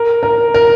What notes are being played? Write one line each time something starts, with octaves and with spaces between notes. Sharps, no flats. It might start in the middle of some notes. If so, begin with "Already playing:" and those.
Already playing: A#4
A#4
A#4